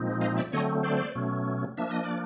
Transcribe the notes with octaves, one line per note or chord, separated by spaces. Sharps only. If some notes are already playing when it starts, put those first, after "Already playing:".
Already playing: A#2 F3 G#3 C4 D#4
D#5 F5
D5 E5
D3 F#3 A3 C4 C#5 D#5
C5 D5
B2 F#3 A3 C#4
F3 A#3 D4 E5
D#5
D5